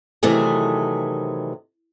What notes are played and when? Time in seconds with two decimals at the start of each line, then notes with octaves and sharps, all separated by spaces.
0.23 C3 D#3 E3 F#3 A3 G#4